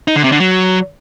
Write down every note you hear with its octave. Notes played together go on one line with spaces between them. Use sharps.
D#4
D3
C3
D3
F#3